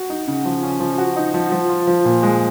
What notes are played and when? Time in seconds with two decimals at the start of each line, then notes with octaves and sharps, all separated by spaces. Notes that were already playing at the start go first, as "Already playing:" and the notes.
Already playing: F#4
0.10 D#4
0.27 C#3
0.45 F3
0.63 C#4
0.80 F3
0.98 F#4
1.16 D#4
1.34 F3
1.52 F3
1.69 F4
1.87 F3
2.05 A#2
2.23 G#3